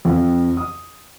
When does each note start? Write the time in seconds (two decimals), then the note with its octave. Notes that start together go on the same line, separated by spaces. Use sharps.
0.05 F2
0.57 D#6